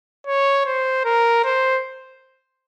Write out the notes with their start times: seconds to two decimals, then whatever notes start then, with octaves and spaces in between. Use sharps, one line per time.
0.27 C#5
0.66 C5
1.05 A#4
1.44 C5